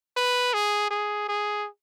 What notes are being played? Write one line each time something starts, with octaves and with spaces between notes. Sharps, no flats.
B4
G#4
G#4
G#4